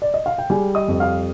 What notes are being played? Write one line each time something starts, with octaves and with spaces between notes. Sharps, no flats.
D5
D#5
F5
G5
G3 G#4 G#5
D#5 D#6
F2
F5 F6